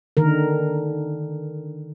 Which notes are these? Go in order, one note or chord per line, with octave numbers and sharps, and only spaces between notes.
D3 D#3 A#4